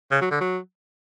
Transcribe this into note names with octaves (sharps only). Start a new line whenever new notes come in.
C#3
F#3
D3
F#3